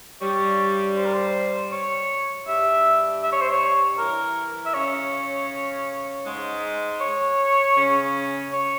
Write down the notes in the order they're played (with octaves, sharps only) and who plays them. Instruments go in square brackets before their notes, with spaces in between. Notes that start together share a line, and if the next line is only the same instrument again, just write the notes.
[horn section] G2 G3 [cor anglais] C#5
[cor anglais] C5
A#4
C5
C#5
[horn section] G2 G3 [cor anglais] E5
[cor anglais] E5
C#5
C5
C#5
[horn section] E3 E4 [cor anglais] A#4
[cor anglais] E5
[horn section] C#3 C#4 [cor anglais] C#5
[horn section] G#2 G#3
[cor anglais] C#5
[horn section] C#3 C#4
[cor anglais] C#5